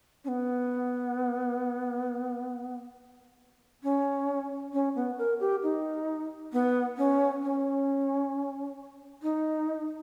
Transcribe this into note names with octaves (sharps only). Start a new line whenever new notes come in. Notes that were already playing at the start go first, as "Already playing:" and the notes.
C#4
B3
C#4
C#4
B3
A#4
G4
D#4
B3
C#4
C#4
D#4